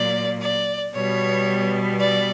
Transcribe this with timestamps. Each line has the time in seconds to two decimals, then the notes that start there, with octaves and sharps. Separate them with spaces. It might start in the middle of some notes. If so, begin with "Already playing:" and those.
Already playing: A#2 F#3 A#3 D5
0.42 D5
0.94 B2 G3 B3 C#5
2.00 D5